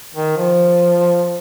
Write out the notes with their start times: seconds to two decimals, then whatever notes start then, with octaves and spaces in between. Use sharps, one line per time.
0.14 D#3
0.37 F3